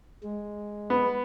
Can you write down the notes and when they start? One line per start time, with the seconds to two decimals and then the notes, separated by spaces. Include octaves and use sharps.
0.23 G#3
0.90 B3